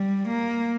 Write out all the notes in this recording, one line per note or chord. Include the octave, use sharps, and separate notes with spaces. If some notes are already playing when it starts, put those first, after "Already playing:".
Already playing: G3
A#3